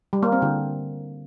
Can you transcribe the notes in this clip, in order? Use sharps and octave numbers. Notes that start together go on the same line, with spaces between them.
G3
A#3
C4
D3